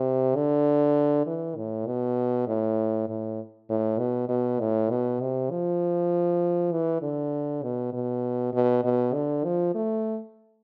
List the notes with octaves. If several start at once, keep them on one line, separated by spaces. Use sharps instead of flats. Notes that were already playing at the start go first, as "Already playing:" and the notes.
Already playing: C3
D3
E3
A2
B2
A2
A2
A2
B2
B2
A2
B2
C3
F3
E3
D3
B2
B2
B2
B2
D3
F3
A3